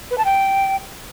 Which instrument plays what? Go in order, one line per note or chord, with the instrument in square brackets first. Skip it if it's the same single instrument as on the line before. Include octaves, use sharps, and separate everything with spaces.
[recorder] B4
A5
G5